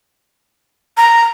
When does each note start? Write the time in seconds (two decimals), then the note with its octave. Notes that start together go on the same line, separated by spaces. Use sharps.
0.97 A#5